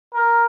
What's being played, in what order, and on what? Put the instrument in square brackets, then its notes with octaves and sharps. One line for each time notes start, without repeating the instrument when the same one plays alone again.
[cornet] A#4